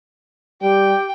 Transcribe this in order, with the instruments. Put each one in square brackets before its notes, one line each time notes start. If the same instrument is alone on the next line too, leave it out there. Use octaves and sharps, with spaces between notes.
[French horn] G3 [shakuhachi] G4 [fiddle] G5